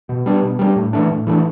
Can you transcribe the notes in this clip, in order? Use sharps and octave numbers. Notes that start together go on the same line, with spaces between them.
B2
G3 B3 D4
B2
G3 B3 D4
A2
E3 A3 D4
A2
E3 A3 D4